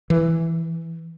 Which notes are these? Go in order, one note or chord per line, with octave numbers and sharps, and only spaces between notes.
E3